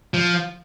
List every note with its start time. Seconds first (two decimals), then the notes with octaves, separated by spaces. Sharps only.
0.14 F3